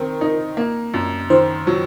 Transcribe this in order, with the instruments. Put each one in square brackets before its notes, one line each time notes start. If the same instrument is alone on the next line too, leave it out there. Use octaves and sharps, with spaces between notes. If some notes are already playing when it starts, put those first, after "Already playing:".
Already playing: [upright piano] D#3 C4 [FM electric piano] A#4
[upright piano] D#4
A#3
F#2
[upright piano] D#3 [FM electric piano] C5
[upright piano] F#3